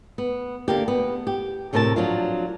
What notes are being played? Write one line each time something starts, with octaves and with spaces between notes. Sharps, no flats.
B3
D3 A#3 G4
B3
G4
D2 A2 C3 A#4 G#5 A5
F3 F#3 D4 F4